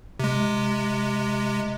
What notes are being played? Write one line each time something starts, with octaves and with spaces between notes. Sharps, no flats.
C3 G#3